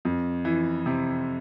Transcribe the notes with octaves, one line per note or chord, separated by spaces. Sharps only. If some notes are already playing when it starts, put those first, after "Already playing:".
F2
E3
C3